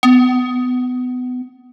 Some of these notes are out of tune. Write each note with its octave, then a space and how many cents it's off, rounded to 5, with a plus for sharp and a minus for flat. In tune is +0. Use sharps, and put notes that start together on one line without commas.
B3 +25